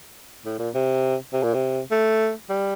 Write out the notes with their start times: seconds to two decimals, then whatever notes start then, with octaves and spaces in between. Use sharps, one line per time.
0.45 A2
0.59 A#2
0.74 C3
1.33 C3
1.43 A#2
1.54 C3
1.91 A3
2.49 G3